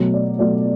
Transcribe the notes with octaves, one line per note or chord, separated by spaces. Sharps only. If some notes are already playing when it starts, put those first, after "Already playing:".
Already playing: B2 F#3 A3
D5
B2 F#3 A3 D5